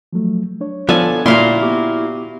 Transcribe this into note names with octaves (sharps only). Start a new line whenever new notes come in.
F3 F#3 A3
D4 C#5
F3 B3 A4 D5 G#5
A#2 E4 F#4 F5 C6
B3 G4 D6